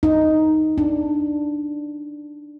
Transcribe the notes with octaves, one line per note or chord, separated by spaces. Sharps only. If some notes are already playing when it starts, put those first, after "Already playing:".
D#4
D4